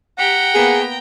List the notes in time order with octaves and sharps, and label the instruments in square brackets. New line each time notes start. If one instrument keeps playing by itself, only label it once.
[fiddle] G4 [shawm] F#5 [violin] G5 A#5
[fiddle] A#3 B3 [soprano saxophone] G#4